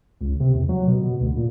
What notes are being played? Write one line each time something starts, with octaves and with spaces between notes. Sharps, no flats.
C#2
C3
E2
F#3
B2
B2
D2
A#2